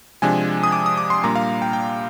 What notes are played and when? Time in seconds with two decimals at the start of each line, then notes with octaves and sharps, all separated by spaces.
0.22 C3 F3 G#3 D4 G#5
0.63 D#6
0.72 D6
0.86 D#6
0.97 D6
1.10 C6
1.24 A#2 G3 A#3 D4 A#5
1.35 F5
1.62 G5
1.73 G5